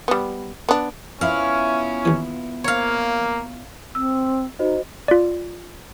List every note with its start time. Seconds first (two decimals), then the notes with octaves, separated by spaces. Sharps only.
0.08 G3 B3
0.69 B3 D4
1.21 B3 C#4 E4 F4 F5
2.05 D#2 E3
2.64 A#3 C#5 F5
3.95 C4 E6
4.59 D#4 F#4 C5 D#5
5.08 F4 D5